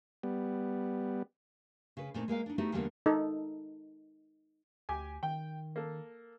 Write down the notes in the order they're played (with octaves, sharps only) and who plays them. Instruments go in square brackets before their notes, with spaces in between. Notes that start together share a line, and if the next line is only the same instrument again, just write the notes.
[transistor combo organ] G3 B3
[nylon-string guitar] C#3 B4
A#2 A3 C4 D#4
G#3 A#3 B4 F5
D4 D#4
A3 B3 D#4 E4 F#4 G4
E2 D3 G3 A#3 B3
[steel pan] D#4 A4
[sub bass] D2 [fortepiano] G4 G#5
[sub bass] D#3 [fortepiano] G5
[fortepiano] A#3 A4